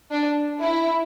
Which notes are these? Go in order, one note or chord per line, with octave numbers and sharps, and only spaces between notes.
D4
E4